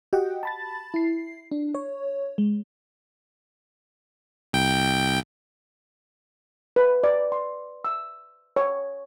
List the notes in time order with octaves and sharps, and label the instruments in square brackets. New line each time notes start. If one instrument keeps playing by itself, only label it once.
[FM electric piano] F#4 G4 D#5 F#5 G5
A5 B5 A6
E4 C7
D4
C#5
G#3
[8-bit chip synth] C2 G5
[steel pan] B4
D5
C6
E6
C#5